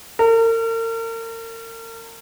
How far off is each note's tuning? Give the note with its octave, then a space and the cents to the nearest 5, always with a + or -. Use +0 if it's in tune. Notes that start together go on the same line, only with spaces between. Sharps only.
A#4 -40